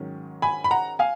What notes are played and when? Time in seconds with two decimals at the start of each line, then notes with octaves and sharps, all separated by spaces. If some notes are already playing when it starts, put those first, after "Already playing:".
Already playing: G#2 D#3 F#3 C#4
0.42 G#5 B5
0.64 B5
0.71 F#5 A#5
0.99 F5 G#5